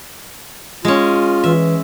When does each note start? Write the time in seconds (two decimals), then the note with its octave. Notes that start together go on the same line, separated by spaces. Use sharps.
0.85 G#3 C#4 F4
1.44 E3 E5